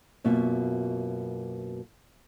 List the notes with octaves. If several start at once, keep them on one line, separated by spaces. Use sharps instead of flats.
F#2 B2 A#3 F4 E5